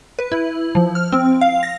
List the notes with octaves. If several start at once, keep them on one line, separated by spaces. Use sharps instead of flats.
B4
E4
F3
F6
C4
F5
A#6